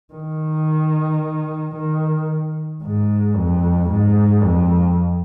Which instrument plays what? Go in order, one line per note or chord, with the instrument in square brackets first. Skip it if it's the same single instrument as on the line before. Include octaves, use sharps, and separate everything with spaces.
[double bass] D#3
D#3
G#2
F2
G#2
F2